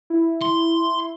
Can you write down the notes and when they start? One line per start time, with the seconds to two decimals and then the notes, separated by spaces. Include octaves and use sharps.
0.10 E4
0.41 C6